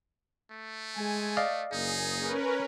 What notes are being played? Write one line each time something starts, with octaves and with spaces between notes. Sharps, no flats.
A3
G#3 G#5
D5 D#5 F5
F#1 A#3 D#4 G#4
C#4 A#4 B4